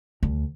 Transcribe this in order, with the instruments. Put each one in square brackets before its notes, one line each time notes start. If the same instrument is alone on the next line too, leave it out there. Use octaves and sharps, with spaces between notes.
[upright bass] D2